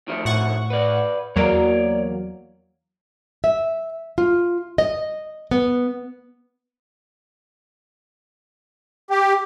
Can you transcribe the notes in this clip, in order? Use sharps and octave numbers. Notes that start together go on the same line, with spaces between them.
D#3 F3 A3
A2 F#5 C#6
B4 D5
E2 F#3 A#3 C#5 D5 A#5
E5
F4
D#5
B3
G4